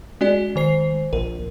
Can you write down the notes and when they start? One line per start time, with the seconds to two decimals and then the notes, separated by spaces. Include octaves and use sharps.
0.21 G#3 C#4 F#4 D5
0.56 D#3 C5 C7
1.13 A#1 A#4